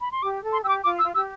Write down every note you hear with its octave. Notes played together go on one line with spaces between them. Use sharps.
B5
C6
G4 D6
A4
C6
G4 E6
D6
F4 D6
E6
F4
G4 E6